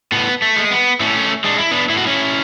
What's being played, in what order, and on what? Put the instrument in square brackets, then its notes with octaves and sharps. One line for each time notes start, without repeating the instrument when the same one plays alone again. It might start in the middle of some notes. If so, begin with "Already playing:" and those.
[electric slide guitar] A2 B3
A3
G#3
B3
A2 A3 C#4
G#3 D4
E4
B3 D4
A2 E4
F#4
C#4 E4